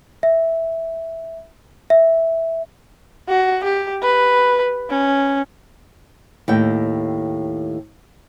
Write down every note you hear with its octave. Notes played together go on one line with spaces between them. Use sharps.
E5
E5
F#4
G4
B4
C#4
D#2 A2 G5